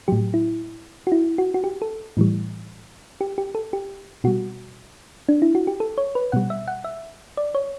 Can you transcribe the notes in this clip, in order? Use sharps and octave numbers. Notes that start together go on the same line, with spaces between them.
A2 F#3 G4
E4
F#4
E4
F#4
F#4
G4
A4
A2 E3 G3
G4
G4
A4
G4
B2 G3 F#4
D4
E4
F#4
G4
A4
C#5
B4
B2 G3 F#5
E5
F#5
E5
D5
C#5